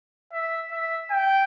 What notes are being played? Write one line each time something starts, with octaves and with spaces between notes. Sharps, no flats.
E5
E5
G5